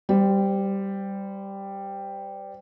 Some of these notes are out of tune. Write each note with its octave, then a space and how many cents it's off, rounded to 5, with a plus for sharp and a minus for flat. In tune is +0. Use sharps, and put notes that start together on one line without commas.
G3 +0 C5 -25